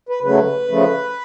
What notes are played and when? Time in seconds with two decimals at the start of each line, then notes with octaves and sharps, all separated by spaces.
0.09 B4
0.23 C#3 F#3 A3 B4
0.68 C#3 F3 A3